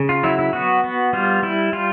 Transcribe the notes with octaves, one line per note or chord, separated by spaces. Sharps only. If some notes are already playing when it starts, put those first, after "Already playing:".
Already playing: C#3
F4
F#3 E4
E4
B3 F#4
B3
G3 F4
G3 E4
G3 F4